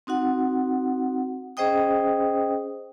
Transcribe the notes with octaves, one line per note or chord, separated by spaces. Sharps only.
C4 D#4 F#4 F#5
C#4 G#4 C5 D#5 G5 D#6